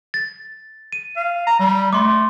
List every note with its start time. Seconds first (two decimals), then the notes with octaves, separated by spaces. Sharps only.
0.14 A6
0.93 D#7
1.16 F5
1.47 A#5
1.60 G3
1.93 A3 C6 D6